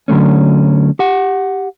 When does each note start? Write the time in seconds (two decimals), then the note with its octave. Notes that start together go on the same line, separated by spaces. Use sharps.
0.08 D3 F#3 A3 C#4
0.99 G4 F#5